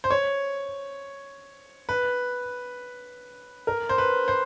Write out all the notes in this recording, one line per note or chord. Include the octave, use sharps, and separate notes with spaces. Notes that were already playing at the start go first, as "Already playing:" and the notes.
C5
C#5
B4
A#4
C5
B4
C5